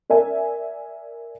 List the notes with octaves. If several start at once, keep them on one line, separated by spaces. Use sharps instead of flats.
A#4 D5 E5 G#5